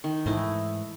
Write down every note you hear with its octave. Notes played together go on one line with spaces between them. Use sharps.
D#3
G#2 E3 A3 E4 D#5